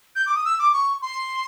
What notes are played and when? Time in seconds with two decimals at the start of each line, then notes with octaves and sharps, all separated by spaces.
0.16 G6
0.26 D6
0.35 D#6
0.45 E6
0.59 D6
0.73 C#6
1.02 C6